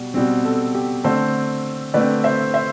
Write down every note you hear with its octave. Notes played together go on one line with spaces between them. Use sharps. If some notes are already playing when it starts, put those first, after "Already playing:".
Already playing: B2 G3
B2 G3 C4
A4
G4
D3 A3 C4 A4 C5
D3 A3 C4 B4 D5
C5 E5
C5 E5